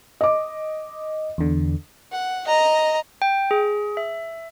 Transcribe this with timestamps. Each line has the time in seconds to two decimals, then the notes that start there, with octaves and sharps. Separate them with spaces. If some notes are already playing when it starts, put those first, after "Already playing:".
0.21 D#5 D6
1.38 E2 D3
2.12 F#5
2.47 D#5 A#5
3.22 G5
3.51 G#4
3.97 E5